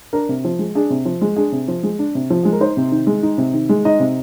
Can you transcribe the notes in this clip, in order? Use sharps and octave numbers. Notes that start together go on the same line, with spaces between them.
D4 A#4
C3
F3
G#3
D4 G#4
C3
F3
G#3
D4 G#4
C3
F3
G#3
D4
C3
F3
G#3 G#4
A#4
D#4 C5
C3
D#3
G#3
D#4
C3
D#3
G#3
D#4 D#5
C3